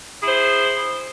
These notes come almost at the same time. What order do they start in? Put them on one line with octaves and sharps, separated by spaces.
G#4 E4 C5